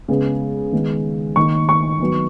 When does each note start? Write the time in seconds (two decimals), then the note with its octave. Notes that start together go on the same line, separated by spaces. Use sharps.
0.08 C#3 G#3 B3
0.72 D#3 G#3 B3
1.36 D#3 A#3 C#6
1.69 C#6
2.00 D#3 F#3 B3